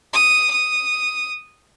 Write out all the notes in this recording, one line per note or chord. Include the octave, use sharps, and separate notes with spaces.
D#6
D#6